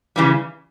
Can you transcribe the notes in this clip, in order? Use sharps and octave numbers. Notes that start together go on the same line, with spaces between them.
C#3 E3 G3